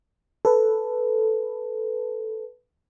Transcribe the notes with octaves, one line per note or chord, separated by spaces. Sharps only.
A4 B4